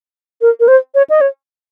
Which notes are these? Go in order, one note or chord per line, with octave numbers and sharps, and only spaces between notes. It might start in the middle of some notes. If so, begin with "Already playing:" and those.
A#4
A#4
C5
C#5
D#5
C#5